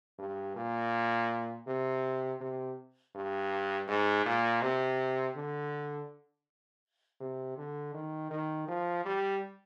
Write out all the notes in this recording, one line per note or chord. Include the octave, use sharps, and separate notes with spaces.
G2
A#2
C3
C3
G2
G#2
A#2
C3
D3
C3
D3
D#3
D#3
F3
G3